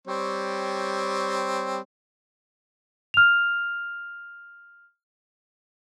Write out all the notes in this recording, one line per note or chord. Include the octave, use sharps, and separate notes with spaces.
G3 C4 C#5
F6 F7